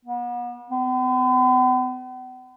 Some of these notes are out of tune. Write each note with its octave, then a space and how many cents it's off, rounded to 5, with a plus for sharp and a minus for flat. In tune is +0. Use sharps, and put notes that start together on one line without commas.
B3 -40
B3 +45